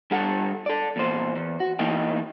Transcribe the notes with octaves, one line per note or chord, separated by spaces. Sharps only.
G3 D4 G4 A4 F#5
A4 D5
E2 A#2 C5
E2
F#4
E2 E3 A#3 D#4 D#5 G5